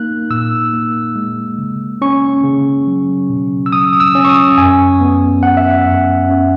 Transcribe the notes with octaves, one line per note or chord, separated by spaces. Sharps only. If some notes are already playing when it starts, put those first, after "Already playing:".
Already playing: A#3 D#4 F#6
A#2 E6
A#3
G#3
C#3
C#4 C#6
C#3
F#3
B2
E6
F#3 D#6
D#6
E6
C#4
C#6
D#6
F#2 G#5
B3
B3 F#5
E5
F#5
F#2
C#4